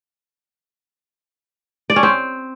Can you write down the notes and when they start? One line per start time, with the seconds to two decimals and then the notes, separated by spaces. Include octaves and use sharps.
1.90 D5
1.96 C#4
2.03 C4